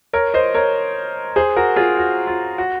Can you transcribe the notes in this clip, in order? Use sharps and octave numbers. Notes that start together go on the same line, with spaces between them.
A#4 C#5
C5 D#5
A#4 C#5
G#4 C5
F#4 A#4
F4 G#4
F#4
F4
F#4